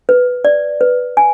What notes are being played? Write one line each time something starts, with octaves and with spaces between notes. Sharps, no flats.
B4
D5
B4
G#5